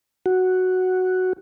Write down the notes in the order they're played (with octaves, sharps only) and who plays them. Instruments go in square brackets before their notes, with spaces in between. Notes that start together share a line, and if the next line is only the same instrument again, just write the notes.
[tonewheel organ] F#4